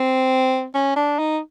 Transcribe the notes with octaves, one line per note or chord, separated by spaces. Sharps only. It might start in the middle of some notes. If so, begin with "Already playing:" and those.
Already playing: C4
C#4
D4
D#4